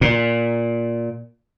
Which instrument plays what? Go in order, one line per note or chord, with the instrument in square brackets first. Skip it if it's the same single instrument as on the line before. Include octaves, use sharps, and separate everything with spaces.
[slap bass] A#2